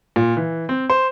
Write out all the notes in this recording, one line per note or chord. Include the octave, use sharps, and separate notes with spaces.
A#2
E3
C4
C5